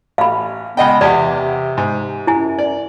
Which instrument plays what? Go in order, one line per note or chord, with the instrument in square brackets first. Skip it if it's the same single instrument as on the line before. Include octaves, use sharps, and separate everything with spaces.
[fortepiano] A1 [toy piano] F5 B5
[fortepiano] C#2 D#5 G5 [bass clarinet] B3
[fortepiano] E2 G4 [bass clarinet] C3 [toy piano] D5 F#5
[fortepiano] G#2
[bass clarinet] F#2 [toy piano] E4 G#5
[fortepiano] D5